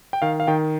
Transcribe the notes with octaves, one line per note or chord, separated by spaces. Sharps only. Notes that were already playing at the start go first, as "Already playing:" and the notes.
G5
D#3 F5
F5
D#3 G5